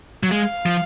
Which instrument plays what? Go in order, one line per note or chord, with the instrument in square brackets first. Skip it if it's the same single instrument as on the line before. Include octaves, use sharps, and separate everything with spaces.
[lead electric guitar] F#3
[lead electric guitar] G#3 [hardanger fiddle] F5
[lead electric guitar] F3